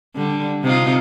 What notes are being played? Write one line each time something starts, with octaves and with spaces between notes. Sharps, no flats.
D3 G3
C3 D#4 F4